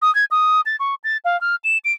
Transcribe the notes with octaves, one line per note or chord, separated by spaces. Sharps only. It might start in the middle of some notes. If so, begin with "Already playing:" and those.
D#6
G#6
D#6
A6
C#6
A6
F5
F6
E7
D7